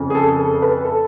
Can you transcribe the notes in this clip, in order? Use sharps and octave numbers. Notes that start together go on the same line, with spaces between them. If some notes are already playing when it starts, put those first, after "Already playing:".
Already playing: F2 C#3
G#4
A4
A4
A4
B4
A4